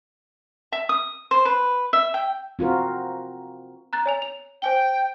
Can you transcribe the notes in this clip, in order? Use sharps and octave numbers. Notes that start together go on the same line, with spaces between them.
E5
D#6
C5
B4
E5
G5
C4 F4 F#4 A#4
A#5 F#6 A6
C#5 G#5 F7
F7
C5 G5 G#5 G7